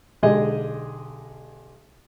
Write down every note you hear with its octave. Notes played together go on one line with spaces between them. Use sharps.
B1 D3 G#3 G4 G#4 D#5